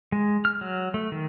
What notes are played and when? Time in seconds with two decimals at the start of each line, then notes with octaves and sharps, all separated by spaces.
0.12 G#3
0.45 F6
0.61 F#3
0.94 A3
1.12 D#3